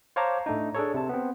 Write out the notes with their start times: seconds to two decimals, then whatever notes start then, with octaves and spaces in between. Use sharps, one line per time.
0.16 C5 C#5 F5 A5 A#5 D6
0.46 A2 A3 D4 D#4
0.74 D4 G#4 A4 C#5
0.94 C3 A5
1.09 B3 C4